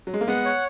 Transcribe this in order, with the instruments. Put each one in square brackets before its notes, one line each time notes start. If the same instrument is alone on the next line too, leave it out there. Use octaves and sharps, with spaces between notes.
[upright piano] F#3
G#3
A#3
[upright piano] G#3 B3 [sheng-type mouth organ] F#5
[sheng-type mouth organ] C#5